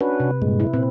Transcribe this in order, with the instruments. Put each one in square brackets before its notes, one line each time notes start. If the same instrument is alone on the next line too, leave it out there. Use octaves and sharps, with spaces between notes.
[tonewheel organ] C#4 D4 F#4 [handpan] B4
[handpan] C3
[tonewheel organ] G2 A#2 G#3
[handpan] E4
[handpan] A#2 C4 [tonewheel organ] B4